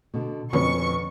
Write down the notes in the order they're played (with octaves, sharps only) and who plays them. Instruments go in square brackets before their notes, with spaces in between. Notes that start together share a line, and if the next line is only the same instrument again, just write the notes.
[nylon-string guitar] B2 D3
[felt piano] F2 C#4 B4 [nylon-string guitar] B2 B3 [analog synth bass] D3 [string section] C#6